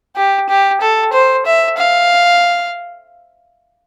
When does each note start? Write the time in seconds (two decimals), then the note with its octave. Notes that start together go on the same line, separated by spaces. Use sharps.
0.17 G4
0.49 G4
0.81 A4
1.13 C5
1.46 E5
1.78 F5